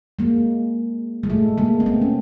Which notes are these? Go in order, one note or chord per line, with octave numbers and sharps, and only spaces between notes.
G#3 A#3
G#3
A3
G#3 A#3
C4
A3 B3
C#4